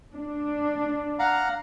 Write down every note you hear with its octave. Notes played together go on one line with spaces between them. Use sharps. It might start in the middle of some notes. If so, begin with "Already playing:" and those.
D4
F5 F#5 A#5